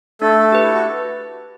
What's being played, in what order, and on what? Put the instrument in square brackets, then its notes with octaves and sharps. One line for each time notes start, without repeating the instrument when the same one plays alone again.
[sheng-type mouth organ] A3 A4 [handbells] D4
[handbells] G4 B4
[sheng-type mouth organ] E4
F#4